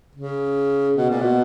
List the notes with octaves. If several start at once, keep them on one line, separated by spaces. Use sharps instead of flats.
C#3
B2
A#2
B2